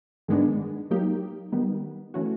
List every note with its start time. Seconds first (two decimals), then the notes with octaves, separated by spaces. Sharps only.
0.28 G#2 D#3 G#3 B3 D4
0.91 F#3 A#3 D#4 G4
1.52 D#3 G3 B3
2.14 E3 A3 C#4 F#4